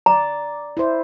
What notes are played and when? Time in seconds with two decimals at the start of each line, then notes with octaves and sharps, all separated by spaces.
0.06 D5 A#5
0.77 E4 C5